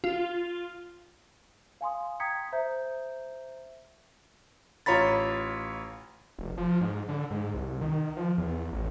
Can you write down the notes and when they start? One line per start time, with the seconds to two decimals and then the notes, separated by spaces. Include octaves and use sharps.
0.04 F4
1.81 F5 G#5 C6 D#6
2.20 G5 A#5 D#6 G#6 B6 C#7
2.52 C5 E5 A#5 G6
4.86 A1 F4 C#5 A#5 B5 A6
6.39 F1
6.57 F3
6.81 G#2
7.08 D3
7.31 G#2
7.54 C2
7.81 D#3
8.17 F3
8.38 E2
8.72 A1